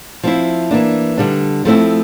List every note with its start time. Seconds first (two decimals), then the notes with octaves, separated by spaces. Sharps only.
0.23 F3 C4 E4
0.71 E3 A#3 D4
1.17 D3 G3 D4
1.65 F3 A3 C4 E4